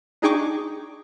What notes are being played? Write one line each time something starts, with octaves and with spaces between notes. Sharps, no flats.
D4 D#4 G#4 G5 C#6 D6